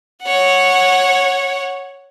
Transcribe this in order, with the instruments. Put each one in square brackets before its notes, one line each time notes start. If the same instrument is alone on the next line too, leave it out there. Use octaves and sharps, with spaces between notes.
[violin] C#5 F#5